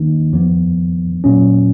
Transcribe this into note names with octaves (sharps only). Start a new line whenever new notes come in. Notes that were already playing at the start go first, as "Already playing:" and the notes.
Already playing: D#3 A#3 D#4
F2 F3 B3
A#2 F#3 C#4